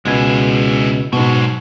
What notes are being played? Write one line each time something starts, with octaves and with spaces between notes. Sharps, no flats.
C#2 B2 G#3 E4 G#5
G#2 B2 F#3 G#3